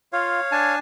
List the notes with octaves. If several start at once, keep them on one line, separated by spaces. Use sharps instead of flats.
F4 C#5 F5
D4 G#5 A5